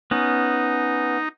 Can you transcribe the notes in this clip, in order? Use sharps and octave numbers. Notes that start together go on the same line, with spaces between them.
B3 C#4 D#4